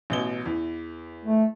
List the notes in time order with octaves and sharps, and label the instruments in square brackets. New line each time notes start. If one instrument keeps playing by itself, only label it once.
[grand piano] A1 B2 G7
E2
[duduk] A3